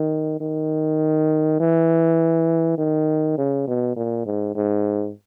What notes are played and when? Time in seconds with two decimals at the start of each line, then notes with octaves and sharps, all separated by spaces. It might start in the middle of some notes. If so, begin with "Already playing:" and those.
Already playing: D#3
0.41 D#3
1.60 E3
2.78 D#3
3.38 C#3
3.68 B2
3.97 A#2
4.26 G#2
4.55 G#2